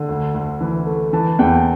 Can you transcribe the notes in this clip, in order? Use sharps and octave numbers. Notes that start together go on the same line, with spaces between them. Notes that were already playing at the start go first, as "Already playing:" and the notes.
Already playing: D3
D2
D2
E3
A3
E3 A5
E2 G5